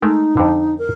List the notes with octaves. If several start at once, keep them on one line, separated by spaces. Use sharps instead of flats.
G#3 A3 D#4 A#4
F2 D3
A#4